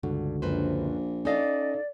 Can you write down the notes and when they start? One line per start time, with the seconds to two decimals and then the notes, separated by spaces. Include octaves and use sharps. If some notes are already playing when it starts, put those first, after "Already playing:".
0.03 C#2 G2 D3 F#4
0.42 A#1 F#2 B4 C5
1.25 C#4 D#4 A4 D5 D#5 F5